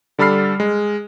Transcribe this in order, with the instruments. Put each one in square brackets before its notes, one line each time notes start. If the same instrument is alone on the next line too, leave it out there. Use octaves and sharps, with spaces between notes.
[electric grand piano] D3 G3 A4 B5 F6 C7
G#3